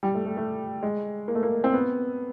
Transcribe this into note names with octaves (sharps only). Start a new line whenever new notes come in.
G3
A3
A3
A3
G#3
A#3
A3
A#3
C4
B3